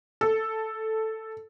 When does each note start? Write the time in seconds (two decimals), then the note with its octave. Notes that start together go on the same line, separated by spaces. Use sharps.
0.21 A4